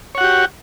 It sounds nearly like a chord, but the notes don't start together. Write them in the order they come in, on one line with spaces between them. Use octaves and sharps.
C#5 F#5 F#4 G4